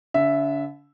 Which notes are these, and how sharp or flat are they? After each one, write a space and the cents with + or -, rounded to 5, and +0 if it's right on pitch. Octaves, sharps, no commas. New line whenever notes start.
D3 -40 E5 +0